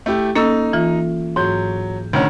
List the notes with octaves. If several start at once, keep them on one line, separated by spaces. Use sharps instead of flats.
A3 E4 G4
A#3 C#4 D#4 A4 E6
E3 F4
G#2 F#3 G6
D2 D#3 C#4